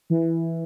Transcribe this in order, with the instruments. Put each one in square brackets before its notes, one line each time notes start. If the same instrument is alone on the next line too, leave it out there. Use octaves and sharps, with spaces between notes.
[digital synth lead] E3